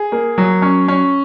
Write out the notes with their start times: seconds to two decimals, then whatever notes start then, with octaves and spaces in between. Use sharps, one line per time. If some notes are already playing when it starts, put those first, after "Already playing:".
Already playing: G#4
0.12 A#3
0.38 F#3
0.62 C#4
0.88 C#4